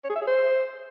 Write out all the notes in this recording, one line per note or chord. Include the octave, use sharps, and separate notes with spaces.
C#5
G#4
E5
G#4
C5